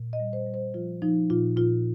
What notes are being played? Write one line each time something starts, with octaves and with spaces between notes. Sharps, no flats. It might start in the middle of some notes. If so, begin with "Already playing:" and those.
Already playing: A#2
D#5
G3
C5
G3
C5
F3 F4
F3 D#4
A#2 F4
A#2 F4